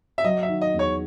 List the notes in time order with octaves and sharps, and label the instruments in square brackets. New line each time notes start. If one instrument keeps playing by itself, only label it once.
[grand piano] E5
[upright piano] F#3 [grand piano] D#5
[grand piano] E5
[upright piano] D#3
[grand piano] D#5
[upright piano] E2
[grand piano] C#5